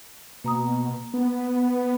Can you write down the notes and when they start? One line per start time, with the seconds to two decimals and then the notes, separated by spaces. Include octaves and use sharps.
0.44 B2 A#3 A#5 D#6
1.14 B3